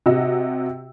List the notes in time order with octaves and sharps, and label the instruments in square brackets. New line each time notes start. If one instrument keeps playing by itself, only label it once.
[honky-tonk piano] C3 F#4 D#5 E6